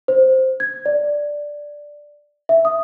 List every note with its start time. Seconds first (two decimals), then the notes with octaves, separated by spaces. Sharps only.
0.08 C5
0.60 G#6
0.86 D5
2.49 E5
2.65 D#6